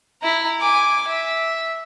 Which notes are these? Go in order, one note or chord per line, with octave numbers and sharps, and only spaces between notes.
E4 A#5
G#5 D6
E5